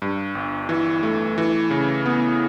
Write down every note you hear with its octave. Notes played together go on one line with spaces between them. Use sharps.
G2
G1
E3
A3
E3
C#3
B3